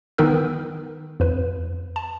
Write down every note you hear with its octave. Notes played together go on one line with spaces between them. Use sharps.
D#3 B3 D#4 A#4 B4 E6
F2 B4
A5